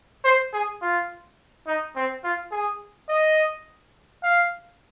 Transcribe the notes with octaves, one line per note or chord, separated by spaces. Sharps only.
C5
G#4
F4
D#4
C4
F4
G#4
D#5
F5